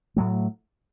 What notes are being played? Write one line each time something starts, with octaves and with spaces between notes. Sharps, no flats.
A2 F#3 A3